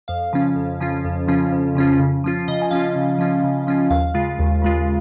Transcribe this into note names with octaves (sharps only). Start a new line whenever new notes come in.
F2 F5
C#3 F3 C#4 F4
F2
C#3 F3 C#4 F4
F2
C#3 F3 C#4 F4
F2
C#3 F3 C#4 F4
C#3
F3 C#4 F4
C#3 D#5
G#5
F3 C#4 F4 F5
C#3
F3 C#4 F4
C#3
F3 C#4 F4
D#2 F5
C#3 G#3 F4
D#2
C#3 G#3 F4